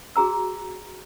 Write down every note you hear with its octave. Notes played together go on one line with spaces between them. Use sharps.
F#4 G#4 A#5 E6